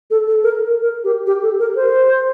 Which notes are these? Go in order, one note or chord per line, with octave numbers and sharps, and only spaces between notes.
A4
A4
A#4
A#4
G4
G4
A4
A#4
C5